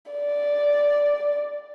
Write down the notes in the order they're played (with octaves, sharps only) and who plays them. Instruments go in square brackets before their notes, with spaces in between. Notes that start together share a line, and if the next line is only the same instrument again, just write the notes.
[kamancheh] D5